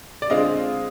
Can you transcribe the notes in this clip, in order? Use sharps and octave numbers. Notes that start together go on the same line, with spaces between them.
D5
D3 G#3 C4 F4 D#5